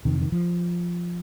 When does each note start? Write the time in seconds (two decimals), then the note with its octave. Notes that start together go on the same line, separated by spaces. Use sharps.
0.05 F2 C3 D#3
0.21 D#3
0.32 F3